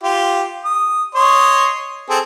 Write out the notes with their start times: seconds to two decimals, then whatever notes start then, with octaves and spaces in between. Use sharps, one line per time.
0.03 F4 G4
0.65 D#6
1.15 C#5 D#5 C6
2.10 C4 G#4 A4